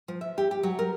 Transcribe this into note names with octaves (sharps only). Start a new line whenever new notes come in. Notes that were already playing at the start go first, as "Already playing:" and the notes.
F3
E5
G4
G4
F#3
A#4